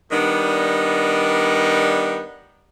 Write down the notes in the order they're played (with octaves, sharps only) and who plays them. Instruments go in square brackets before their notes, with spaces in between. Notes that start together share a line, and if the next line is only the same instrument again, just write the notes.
[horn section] D#3 G3 B3 D4 D#4